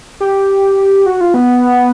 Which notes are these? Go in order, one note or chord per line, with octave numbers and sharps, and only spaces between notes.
G4
F#4
F4
B3